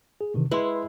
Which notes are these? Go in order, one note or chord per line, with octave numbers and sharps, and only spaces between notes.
G#4
C3 D#3 E3
G#3 E4 B4 C6